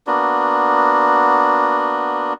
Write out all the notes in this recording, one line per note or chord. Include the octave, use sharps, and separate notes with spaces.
A#3 B3 D4 F#4